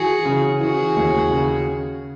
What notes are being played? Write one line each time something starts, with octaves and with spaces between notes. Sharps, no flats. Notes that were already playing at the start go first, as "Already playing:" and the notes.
Already playing: E3 F#4 G#4
C#3
E3 F#4 G#4
D#2
C#3